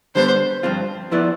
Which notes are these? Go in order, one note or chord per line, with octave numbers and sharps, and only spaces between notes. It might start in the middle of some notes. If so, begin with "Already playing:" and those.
D3 G3 B3 C5
G2 F3 C4 F4
F3 B3 E4 B4 D5